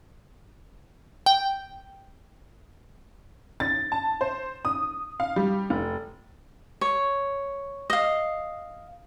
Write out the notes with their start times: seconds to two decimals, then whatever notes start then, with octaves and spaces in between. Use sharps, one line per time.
1.26 G5
3.60 A6
3.92 A5
4.21 C5
4.65 D#6
5.20 F5
5.36 G3
5.70 F1
6.81 C#5
7.90 D#5 F5